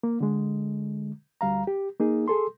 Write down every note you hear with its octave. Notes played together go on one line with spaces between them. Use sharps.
A#3
D3 G#3
D2 G3 F5 A#5
G4
A#3 D#4 G#4
G#4 A4 C6